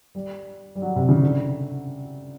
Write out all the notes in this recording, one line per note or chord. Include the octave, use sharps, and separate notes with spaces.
G3
G3
F#3
C3
C#3
D3